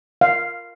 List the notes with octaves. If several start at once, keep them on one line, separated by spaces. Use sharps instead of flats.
F5